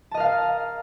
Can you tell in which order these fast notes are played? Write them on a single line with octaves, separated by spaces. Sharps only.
A5 D#5 A#4 F5